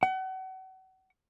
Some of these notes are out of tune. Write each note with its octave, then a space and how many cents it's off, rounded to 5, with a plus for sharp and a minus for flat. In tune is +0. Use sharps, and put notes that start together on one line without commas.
F#5 +35